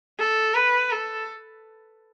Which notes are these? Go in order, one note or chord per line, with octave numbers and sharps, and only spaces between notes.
A4
B4
A4